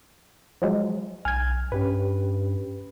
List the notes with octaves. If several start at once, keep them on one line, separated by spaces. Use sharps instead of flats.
F3 F#3 G#3
B1 G#5 F6 G#6
G2 C#4 G4 B4